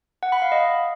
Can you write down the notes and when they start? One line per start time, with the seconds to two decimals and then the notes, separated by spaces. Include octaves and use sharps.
0.23 F#5
0.32 B5
0.42 F5
0.52 D#5